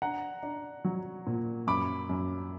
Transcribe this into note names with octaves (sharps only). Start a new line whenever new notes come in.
D4 F#5 A#5
D4
F#3
A#2
F#2 B5 D6
F#2